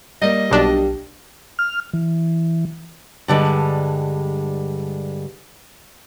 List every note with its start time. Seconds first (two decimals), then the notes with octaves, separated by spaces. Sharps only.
0.22 G3 A#3 D#5
0.51 B1 D4 G4
1.59 F6
1.93 E3
3.28 G2 D3 G3 G#3